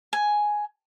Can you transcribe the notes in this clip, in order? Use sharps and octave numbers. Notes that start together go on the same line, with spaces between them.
G#5